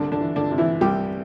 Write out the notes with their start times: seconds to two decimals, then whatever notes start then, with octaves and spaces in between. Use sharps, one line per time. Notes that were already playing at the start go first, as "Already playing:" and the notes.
Already playing: C2 D3 D4
0.12 D3 D4
0.21 E3
0.36 D3 D4
0.51 C3
0.58 E3 E4
0.81 C2 G3 G4